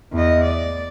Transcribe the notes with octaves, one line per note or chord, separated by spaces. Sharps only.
E2 D#5
D5